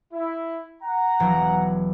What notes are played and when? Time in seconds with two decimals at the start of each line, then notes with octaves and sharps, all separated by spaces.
0.13 E4
0.82 F#5 A#5
1.20 E1 E3 F#3